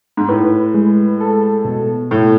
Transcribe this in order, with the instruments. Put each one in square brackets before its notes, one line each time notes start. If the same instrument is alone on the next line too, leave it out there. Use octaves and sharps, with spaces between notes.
[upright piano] G#2
[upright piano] A2 [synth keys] B4
[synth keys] G#3
A4
B2
[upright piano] A2 [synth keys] A3